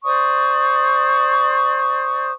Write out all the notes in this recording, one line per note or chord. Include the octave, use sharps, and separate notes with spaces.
C5 D5 C#6 D#6